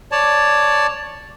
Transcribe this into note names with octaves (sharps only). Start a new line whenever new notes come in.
C#5 D5 A5